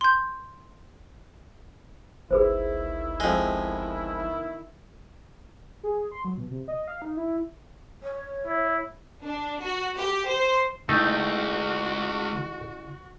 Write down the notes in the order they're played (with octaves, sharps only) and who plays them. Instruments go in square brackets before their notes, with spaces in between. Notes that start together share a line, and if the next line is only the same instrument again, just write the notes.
[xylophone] C6 G6
[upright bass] G1 C#2 [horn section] B2 D#3 E4 [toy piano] G#4 B4 C5
[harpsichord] F2 G#3 [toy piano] D#5
[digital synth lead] G#4
C6
F#3
B2
C3
D#5
F5
D#4
E4
[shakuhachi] C#5
[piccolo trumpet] E4
[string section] D4
F#4
G4
C5
[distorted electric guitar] C#2 [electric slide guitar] C#3 E4 [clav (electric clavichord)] A3 D#4 [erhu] F#4